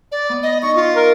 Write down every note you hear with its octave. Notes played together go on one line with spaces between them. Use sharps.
D5
B3
D#5
D#4 C#6
F4
A#4